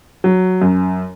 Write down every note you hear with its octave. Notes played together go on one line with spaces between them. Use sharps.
F#3
F#2